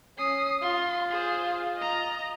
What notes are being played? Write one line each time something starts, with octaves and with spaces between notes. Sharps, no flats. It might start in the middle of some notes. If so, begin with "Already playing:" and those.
C#4 D#6 C7
F4 C6
G#4 C5
D#5 A#5